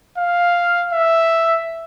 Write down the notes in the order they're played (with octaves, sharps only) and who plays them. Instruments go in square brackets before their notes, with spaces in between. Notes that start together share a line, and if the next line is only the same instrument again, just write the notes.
[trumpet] F5
E5